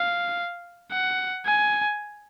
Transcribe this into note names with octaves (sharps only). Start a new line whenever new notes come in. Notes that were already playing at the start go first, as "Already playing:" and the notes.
Already playing: F5
F#5
G#5